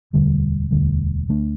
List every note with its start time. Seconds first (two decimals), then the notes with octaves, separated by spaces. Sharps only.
0.13 E1 D2 D3 G3
0.71 E1 D2 D3 G3
1.29 D2 D3 A3 D4